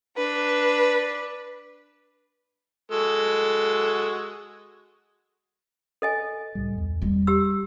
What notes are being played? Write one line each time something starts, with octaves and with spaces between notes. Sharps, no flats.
D4 B4
G#3 F#4 A4
A4 D#5 G#5
C#2 A2 G3
E2
G3 G#3
G4 E6